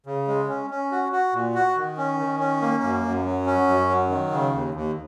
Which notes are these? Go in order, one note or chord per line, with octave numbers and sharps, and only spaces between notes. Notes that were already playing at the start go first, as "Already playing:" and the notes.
C#3
G#3
C#4
C#4
F#4
F#4
A#2
F#4
D#3
C#4
D#3
C#4
A#3
F#2
F#2
F#3
C#4
F#2
F#3
D#3
C#3
D#2
D#2